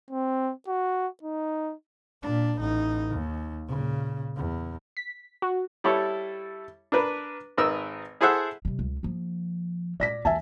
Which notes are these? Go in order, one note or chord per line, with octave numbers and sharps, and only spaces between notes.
C4
F#4
D#4
A#2 D4
A1 D#4
D#2
A#2 C#3
E2
B6
F#4
G3 E4 A4 C#5
D4 A#4 B4
G#1 D#4 A#4 B4 E6
E4 G#4 A4 C5 E5 F#5
C3 G3
C#2
F3 A#3
A#2 D5 A#6 B6
D#2 E3 E5 G#5 A5